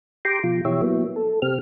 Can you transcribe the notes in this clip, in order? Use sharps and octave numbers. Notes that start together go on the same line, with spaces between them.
G4 G5 A#5 C6 D6
B2 F3 F4
B2 E3 G4 C#5 E5
F#3 A#3 B3 E4
A4
C3 C4 G4 F6